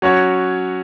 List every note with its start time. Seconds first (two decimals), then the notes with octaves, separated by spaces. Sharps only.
0.02 F#3 C#4 F#4 C#5